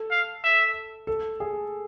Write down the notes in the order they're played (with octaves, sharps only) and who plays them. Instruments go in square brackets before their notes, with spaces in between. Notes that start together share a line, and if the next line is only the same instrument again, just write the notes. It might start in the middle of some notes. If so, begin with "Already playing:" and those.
Already playing: [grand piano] A4
[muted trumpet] F5
E5
[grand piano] A4
G#4